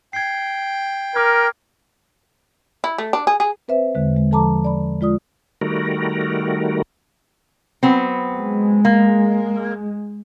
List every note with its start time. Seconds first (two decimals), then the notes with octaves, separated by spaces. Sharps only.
0.13 G5 G#6 C7
1.15 A#4 D6 F6 G#6
2.84 E4
2.98 A3
3.13 D4
3.27 G#4
3.40 G#4
3.68 C4 B4 C5 E5
3.95 E2 D3 G#3
4.15 D3 G#3
4.31 F3 A4 A5 A#5 D6
4.64 D5 B5
5.01 G#3 F4 D5 D#6
5.61 D#3 G3 A3 F#4 A#4
7.83 F#3 B3 C4
8.37 G#3
8.85 A#3